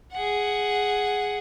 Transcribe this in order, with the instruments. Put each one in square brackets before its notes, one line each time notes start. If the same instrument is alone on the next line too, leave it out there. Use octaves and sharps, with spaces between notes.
[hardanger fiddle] G#4 F#5